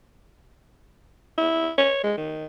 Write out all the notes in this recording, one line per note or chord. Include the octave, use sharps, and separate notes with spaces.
E4
C#5
G#3
D#3